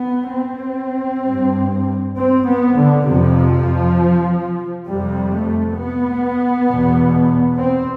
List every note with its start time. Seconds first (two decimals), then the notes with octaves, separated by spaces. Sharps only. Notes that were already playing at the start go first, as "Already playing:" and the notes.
Already playing: B3
0.36 C4
1.26 G2
2.17 C4
2.46 B3
2.77 D3
3.06 F2 C3 F3
4.88 F2 C3 G3
5.32 A3
5.78 B3
6.68 E2 B2
7.58 C4